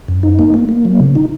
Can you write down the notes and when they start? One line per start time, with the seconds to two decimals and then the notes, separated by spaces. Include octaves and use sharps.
0.08 F#2
0.23 D#4
0.39 A#3
0.54 A#3
0.69 A#3
0.85 F#3
1.00 C#3
1.15 D#4